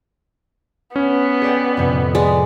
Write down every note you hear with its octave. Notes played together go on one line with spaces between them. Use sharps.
B3 C#4
G#4 D5 G5
F2 A2 C3
G#3 D5